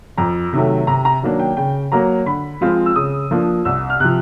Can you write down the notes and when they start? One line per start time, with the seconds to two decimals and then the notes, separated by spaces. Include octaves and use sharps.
0.17 F2 A#5
0.53 C3 D#3 F#3 A3
0.87 C3 A#5
1.05 A#5
1.22 D#3 F#3 A#3 D4
1.39 G5
1.57 C#3 G5
1.92 F#3 A#3 A#5
2.26 D3 B5
2.61 F3 G#3 C4 F4
2.86 E6
2.96 C#3 D#6
3.31 F3 A#3 D4 F4
3.65 C2 E6
3.90 F6
4.00 C3 F3 F#6